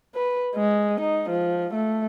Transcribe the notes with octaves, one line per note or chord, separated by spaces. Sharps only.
B4
G#3
D#4
F3
A3